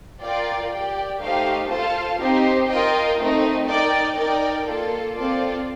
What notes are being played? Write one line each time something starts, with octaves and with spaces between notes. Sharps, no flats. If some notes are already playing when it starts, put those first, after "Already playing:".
F4 A#4 D5 G5
G4 D5 G5
A3 D#4 G4 C5 F5
F4 A4 C5 F5 A5
C4 D#4 G4 C5
F4 A#4 D#5 G5
A3 C4 D#4
D#4 A#4 D5 G5
D#4 A#4 D5 G5
A#3 F4 A4
C4 F4 A4 D5